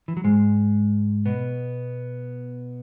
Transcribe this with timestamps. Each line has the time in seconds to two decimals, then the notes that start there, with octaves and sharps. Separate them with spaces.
0.08 E3
0.17 F#3
0.24 G#2 G#3
1.26 B2 B3